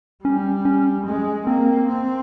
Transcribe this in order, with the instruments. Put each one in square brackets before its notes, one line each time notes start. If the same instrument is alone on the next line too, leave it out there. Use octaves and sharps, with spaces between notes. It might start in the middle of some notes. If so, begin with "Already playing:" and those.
[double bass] G3 [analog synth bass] C#4
[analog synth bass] C#4
[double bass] G#3
[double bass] A#3 [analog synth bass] C4
[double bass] C4